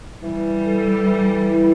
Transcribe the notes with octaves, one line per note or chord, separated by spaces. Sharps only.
E3 G3
A4
E3
E4